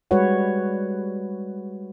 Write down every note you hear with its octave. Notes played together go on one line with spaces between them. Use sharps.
G3 G#3 F#4 B4 C#5 F#5